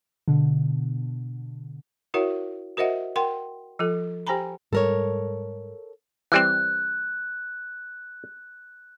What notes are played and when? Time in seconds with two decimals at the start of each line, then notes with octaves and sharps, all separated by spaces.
0.28 B2 D3
2.14 E4 F#4 A#4 C#5 E5 F#5
2.77 F#4 A#4 C5 D#5 E5 F#5
3.16 A#4 F#5 G5 C6
3.79 F3 F4 A4
4.27 G4 C5 G5 G#5 A#5 B5
4.73 G#2 G3 A4 A#4 C#5
6.32 E3 G3 C4 F#6